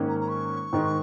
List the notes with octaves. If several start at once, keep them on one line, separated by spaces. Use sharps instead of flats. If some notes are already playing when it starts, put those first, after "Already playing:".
Already playing: G#2 D#3 A#3 C#4
A#5
A#5
C#6
G#2 D#3 G#3